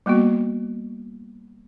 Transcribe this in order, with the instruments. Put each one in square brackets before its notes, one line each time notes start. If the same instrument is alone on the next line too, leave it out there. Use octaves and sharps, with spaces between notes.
[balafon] G3 A#3 B3 F#4